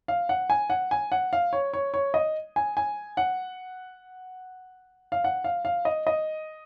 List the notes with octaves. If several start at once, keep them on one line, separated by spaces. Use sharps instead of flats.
F5
F#5
G#5
F#5
G#5
F#5
F5
C#5
C#5
C#5
D#5
G#5
G#5
F#5
F5
F#5
F5
F5
D#5
D#5